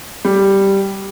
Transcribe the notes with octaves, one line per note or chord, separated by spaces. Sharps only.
G3